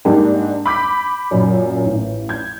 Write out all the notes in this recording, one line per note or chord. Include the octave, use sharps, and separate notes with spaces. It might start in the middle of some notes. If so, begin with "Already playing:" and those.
G#2 G3 A#3 D4 G4
B5 D6 G6 B6
F#2 A#2
A1
G6 G#6